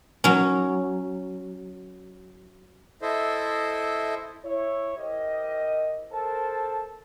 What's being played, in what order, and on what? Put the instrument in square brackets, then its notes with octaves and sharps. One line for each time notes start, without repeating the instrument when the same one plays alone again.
[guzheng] F#3 C#4
[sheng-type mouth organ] E4 A4 C5 D#5 E5
[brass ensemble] E4 C#5
E4 G4 A#4 C5 D#5
A4 A#4 C5 A5